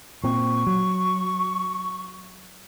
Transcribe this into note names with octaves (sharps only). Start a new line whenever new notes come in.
A#2 C4 C#6
F#3